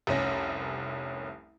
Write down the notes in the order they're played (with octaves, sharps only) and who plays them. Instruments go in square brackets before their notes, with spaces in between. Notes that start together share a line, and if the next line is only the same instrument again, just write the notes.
[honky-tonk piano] F1 C2 C#4 A#6